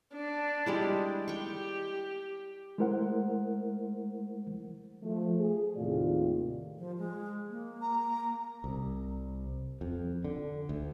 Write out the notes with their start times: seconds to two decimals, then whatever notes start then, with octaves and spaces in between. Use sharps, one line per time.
0.14 D4
0.66 G3 G#3 E4
1.28 G4 G5 C#6
2.78 G#3 A3 E4 A#4 C5 F#5
5.03 F3 A3
5.40 G#4
5.77 D#2 A2 C3 D#3 F4 D5
6.78 F3
6.98 G#3
7.50 A#3
7.82 A#5
8.64 C2
9.81 F2
10.24 D3
10.69 D2